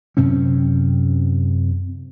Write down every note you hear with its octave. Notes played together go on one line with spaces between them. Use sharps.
F#2 C3 C4 C#4